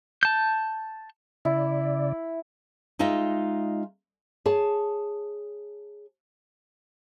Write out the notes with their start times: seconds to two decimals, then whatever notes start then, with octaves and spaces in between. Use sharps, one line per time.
0.23 A5 G6
1.45 C#3 E4 D5
2.99 G#3 D#4 F4 D#5 E5
4.46 G#4 C#5 A5